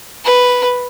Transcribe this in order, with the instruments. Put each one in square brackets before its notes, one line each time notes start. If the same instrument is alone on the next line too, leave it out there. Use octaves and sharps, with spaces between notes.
[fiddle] B4